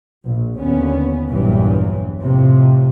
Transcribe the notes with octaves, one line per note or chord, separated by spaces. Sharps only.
A#1
D#2 D3 B3 C#4
A#1 E2 G2 E3 F#3
F2 A2 C3